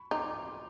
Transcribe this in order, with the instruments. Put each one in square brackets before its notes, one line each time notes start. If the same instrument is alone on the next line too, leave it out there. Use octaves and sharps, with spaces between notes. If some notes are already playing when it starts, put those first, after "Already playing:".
Already playing: [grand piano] B5 C#6
[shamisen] D#4 [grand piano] C6 D6